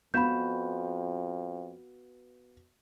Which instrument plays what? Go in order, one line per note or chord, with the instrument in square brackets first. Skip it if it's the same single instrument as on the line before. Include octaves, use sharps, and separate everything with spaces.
[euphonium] F2 [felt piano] B3 F5 [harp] F#4 B4 E7 [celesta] B5 G6